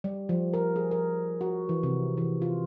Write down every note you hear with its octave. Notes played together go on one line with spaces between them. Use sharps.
G3
F3
A#4
G#4
A#4
F#4
E3
C3
E3
F4